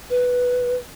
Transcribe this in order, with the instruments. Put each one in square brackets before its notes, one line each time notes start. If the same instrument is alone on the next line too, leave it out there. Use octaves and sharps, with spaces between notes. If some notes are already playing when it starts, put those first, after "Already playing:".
[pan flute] B4